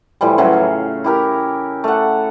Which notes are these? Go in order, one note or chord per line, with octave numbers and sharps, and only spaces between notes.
A2 E3 F3 G3
C#3 E3 F#3
F5
E4 G4 A#4
A3 F#5